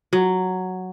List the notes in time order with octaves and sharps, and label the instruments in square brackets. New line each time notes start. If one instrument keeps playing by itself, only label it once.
[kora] F#3